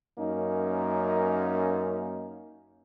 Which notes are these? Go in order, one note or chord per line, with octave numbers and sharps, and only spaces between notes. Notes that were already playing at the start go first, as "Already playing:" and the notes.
F#2 A#3 C#4 D#4